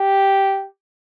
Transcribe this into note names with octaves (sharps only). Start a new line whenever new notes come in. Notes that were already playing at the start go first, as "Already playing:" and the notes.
Already playing: G4